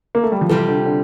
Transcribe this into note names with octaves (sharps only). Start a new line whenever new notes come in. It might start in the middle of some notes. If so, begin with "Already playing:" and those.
A#3
A3
G3
F3
C3 E3 G3 C4 F4 A4
D3
D3